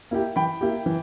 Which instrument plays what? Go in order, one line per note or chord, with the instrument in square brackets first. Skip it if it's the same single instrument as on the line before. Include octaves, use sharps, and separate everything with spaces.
[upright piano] A#3 E4 G4
[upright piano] E3 [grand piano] G5 B5
[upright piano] A#3 E4 G4
E3